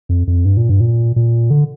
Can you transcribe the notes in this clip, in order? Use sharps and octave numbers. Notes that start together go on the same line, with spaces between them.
F2
F2
G2
A#2
G2
A#2
A#2
D3